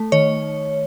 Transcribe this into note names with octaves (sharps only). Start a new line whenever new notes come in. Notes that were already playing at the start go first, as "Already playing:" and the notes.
Already playing: A3
D#3 C#5